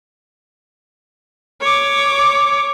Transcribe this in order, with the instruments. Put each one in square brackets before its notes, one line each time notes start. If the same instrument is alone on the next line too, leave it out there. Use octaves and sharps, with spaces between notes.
[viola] C#5 D6